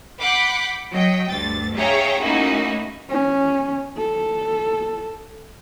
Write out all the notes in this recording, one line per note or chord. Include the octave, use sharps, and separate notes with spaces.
F#5 B5 D6 G6 B6 C7
F#3 D#5 G5
D2 G2 A6
G#4 C#5 E5 F5 G5 A#5
A3 A#3 C#4 D#4 E4 F#4
C#4
A4